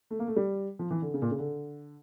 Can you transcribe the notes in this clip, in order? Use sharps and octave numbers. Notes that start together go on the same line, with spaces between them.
A3
A#3
A3
G3
F3
E3
D3
C#3
A#2
C#3
D3